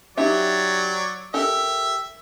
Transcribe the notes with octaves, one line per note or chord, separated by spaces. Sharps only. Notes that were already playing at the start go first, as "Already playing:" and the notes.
F#3 D#4 G4 D5 E5
G4 A4 A#4 E5